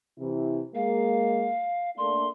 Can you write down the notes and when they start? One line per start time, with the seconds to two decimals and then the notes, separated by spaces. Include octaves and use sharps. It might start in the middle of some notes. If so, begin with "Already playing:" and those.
0.19 C3 E3 E4
0.75 G#3 A#3 F5
1.98 A3 A#3 D4 C6